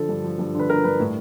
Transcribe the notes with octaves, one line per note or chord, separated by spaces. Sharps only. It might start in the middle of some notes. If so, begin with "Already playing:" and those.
Already playing: D3 F3 A4
G2
F3
G2
D3
B4
D3 A#4
G2 B4
A2